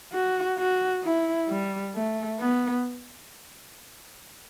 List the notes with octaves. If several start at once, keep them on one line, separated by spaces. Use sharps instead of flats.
F#4
F#4
E4
G3
A3
B3